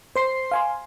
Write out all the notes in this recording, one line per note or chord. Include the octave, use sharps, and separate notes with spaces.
C5 C6 C7
F5 G#5 C6